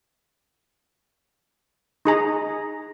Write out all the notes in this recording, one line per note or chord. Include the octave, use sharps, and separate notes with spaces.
D#4 G#4 A#5